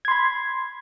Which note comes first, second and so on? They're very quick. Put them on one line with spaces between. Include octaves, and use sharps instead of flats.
G#6 C6 B5